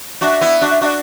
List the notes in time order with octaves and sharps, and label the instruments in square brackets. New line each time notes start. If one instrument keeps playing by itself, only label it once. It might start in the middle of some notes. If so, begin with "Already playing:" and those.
[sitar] D4 F#4 [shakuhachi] E5
[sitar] B3 E4
D4 F#4
[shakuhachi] E5
[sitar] D4 F#4 [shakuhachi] E5
[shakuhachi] D5